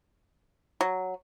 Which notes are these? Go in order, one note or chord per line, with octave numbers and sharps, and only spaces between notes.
F#3